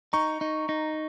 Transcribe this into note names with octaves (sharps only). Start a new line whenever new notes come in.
D#4 A#5 C#6
D#4
D#4